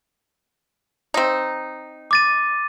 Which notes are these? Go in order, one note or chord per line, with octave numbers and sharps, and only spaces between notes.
C4 D#4
D6 A6 D#7